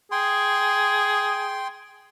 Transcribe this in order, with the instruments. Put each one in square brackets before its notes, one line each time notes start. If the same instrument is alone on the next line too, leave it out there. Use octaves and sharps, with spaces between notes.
[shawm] G#4 [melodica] G5 C6